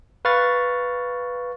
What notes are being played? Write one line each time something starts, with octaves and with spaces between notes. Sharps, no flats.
B4 F5 C#6 F6 A6